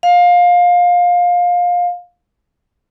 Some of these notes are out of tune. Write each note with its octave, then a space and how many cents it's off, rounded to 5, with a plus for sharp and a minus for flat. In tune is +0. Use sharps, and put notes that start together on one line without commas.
F5 +20